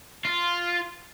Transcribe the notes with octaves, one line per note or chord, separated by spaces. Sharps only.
F4